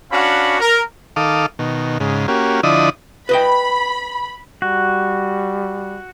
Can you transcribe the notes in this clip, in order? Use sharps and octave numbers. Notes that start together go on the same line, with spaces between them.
C#4 D4 F#4 F5 F#5 B5
A#4
D#3 A4 F5 D6 D#6
B2 D#3
G#2 C#3
A#3 C#4 F#4 G4
D3 F3 E4 D5 D#5 D#6
B4 D#5 G5 B5
G3 F#4